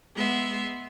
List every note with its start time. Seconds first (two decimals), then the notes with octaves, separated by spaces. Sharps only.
0.15 G#3 B3 E5 C6